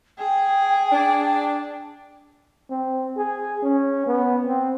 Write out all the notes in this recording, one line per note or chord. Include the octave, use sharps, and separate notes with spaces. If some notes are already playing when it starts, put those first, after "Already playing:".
G#4 G5
D4
C4
G#4
C#4
B3
C4